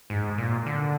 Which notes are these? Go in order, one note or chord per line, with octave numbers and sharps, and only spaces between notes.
G#2
A#2
D3